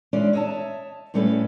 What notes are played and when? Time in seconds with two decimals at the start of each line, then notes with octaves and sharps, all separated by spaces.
0.13 E3 G#3 C#4 D4 D5
0.33 C#5 D#5 E5 G#5 A5
1.14 A2 G3 C#4 A4 B4